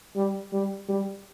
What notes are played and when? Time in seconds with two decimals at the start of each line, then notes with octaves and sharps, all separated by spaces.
0.16 G3
0.53 G3
0.89 G3